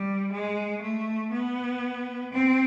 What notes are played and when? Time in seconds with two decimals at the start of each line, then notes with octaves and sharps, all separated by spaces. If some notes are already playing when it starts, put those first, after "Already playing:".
Already playing: G3
0.32 G#3
0.82 A3
1.32 B3
2.32 C4